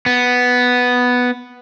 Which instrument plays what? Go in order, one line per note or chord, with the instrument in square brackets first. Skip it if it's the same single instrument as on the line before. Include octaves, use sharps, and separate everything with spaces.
[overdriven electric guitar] B3